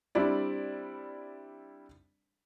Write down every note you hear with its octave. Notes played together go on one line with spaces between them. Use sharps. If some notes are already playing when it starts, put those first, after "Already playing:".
G3 C4 D4 E4 D5